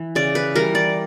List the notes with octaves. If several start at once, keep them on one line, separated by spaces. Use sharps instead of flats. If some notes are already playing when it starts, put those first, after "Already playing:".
Already playing: E3
C#3 D5
B4
E3 G3 A#4
D5